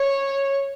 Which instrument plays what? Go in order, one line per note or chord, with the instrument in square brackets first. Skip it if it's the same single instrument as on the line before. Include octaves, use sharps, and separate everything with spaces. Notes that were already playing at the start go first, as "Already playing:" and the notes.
Already playing: [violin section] C#5